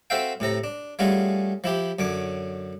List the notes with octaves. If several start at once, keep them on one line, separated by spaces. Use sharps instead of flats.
C4 F#4 A4 E5 F5 G5
A2 C3 A4 A#5
D4
G3 A3 C#4 F4 F#4 G#4
F3 E4 G4
F#2 D3 C#5 D6